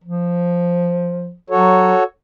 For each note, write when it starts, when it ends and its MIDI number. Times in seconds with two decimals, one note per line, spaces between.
0.04 1.34 53
1.50 1.93 54
1.50 2.03 66
1.50 2.03 69
1.50 2.03 73